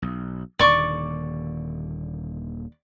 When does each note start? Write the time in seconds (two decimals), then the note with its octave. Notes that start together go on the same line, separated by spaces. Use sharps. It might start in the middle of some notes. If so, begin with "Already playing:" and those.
0.02 B1
0.59 D#1 D#2 D3 D5 C#6 D6